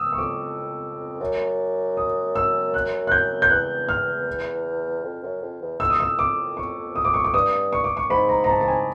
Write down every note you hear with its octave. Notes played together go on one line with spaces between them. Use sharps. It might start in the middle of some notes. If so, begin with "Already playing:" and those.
Already playing: D#6 E6
C#6
F2 D6
F#2
D#6
E6
F#6
F#6
G6
G6
E2 F#6
F6
F2
F#2
F2
E2
F2 E6
D#6
E6
D6
C#6
D#6
D6
C#6
D6
G2 D#6
C#6
D6
C#6
G#2 B5
A#5
A#5
A5
A5
G#5